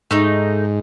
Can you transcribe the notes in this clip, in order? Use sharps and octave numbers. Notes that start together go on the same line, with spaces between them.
G#2 A3 D#4